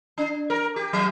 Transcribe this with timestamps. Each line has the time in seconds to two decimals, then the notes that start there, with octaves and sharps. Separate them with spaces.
0.18 D4
0.50 A#4
0.76 G4
0.93 F#3